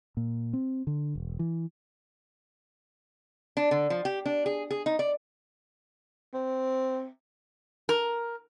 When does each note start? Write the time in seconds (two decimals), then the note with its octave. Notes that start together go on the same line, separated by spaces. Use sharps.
0.17 A#2
0.53 C4
0.87 D3
1.15 E1
1.39 E3
3.57 D4
3.71 D3
3.90 F3
4.05 G4
4.26 D4
4.46 G#4
4.71 G#4
4.86 D#4
4.99 D5
6.34 C4
7.89 A#4